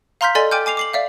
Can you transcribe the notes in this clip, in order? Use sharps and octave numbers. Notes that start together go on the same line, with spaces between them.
F5 A#5 C6 F6 G6 B6
A4 D5 D#5 G#5 C6 A6
G5 G#5 D6 F6 G6
G#5 D6 C7 F7
D6 C7 F#7
D5 E5 F5